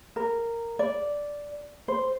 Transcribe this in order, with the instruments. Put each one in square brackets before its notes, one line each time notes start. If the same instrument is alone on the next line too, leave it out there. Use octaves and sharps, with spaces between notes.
[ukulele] A#4
D5
C5